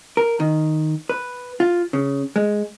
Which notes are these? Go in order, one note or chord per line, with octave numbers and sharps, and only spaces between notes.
A#4
D#3
B4
F4
C#3
G#3